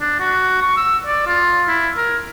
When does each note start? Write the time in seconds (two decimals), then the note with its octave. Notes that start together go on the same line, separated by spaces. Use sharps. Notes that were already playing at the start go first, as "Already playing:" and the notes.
0.01 D4
0.20 F#4
0.62 C#6
0.77 E6
1.07 D5
1.27 F4
1.68 E4
1.98 A#4